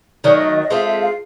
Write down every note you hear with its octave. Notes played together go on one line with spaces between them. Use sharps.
D#3 F#3 A3 D5
D#5
D#5
D#5
G#3 C4 F4 A4 E5
E5
F5